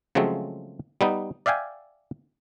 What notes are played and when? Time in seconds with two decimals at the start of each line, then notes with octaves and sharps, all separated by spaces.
0.15 C#3 F3 F#3 G#3 A3 C4
1.01 G3 B3 D#4
1.46 D5 E5 F5 G5 G#5